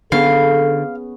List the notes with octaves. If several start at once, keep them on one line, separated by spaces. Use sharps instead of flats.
D3 B3 C#4 G#4 A4 F5